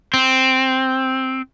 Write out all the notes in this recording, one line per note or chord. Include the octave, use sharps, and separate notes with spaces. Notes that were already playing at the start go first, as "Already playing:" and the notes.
C4